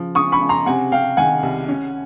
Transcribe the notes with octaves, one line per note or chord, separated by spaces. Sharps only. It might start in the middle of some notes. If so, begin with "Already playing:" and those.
Already playing: C#3 F3
C#3 C#6 D#6
B5 C#6
C#3
A#5 C6
C3 F#5 G#5
C3 F5 G5
D#3 F#5 G#5
C2
C#4